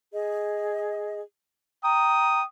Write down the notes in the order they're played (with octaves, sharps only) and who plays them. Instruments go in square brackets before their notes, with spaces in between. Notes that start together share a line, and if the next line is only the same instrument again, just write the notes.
[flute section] G#4 D#5
[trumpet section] G5 D#6 [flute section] A#5